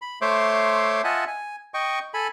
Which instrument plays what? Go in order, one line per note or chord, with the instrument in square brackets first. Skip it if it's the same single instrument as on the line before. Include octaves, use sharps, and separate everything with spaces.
[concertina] B5
A3 C5 C#5 E5 C6 D6
F4 D#5 E5 F#5 G#5 A5
G#5
D#5 G5 C#6
A4 G#5 B5